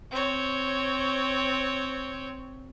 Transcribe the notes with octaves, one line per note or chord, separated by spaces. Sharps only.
C4 C#5